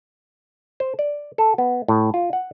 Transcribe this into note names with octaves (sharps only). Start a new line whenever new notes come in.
C5
D5
A4
B3
A2
F4
F#5